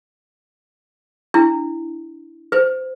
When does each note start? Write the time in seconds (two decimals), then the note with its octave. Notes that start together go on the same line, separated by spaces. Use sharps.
1.34 D4 E4
2.52 B4 C5